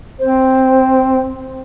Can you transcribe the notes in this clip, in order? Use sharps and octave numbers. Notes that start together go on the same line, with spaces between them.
C4 C5